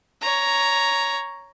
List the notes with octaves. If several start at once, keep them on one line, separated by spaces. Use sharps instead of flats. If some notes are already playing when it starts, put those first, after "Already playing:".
C#5 A#5